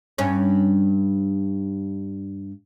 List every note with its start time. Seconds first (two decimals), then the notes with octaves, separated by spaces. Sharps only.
0.18 G2 C#4